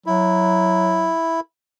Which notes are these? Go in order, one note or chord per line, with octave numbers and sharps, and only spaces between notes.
F#3 E4